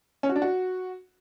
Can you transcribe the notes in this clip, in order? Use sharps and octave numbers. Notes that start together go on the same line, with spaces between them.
C#4
F#4
D4
F#4